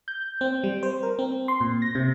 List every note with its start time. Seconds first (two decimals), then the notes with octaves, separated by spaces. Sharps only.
0.08 G6
0.41 C4
0.64 G3
0.83 C5
1.03 A#4
1.19 C4
1.48 C6
1.61 A#2
1.82 A#6
1.95 C3